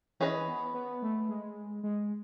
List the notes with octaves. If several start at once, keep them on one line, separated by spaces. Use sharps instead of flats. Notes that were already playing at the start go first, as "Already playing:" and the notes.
E3 C#4 G#4 B4 D#5
B3
B3
A3
G#3
G#3